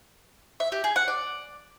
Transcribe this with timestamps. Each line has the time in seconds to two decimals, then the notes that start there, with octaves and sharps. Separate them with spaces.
0.60 E5
0.72 G4
0.84 G#4
0.96 F#5
1.08 D5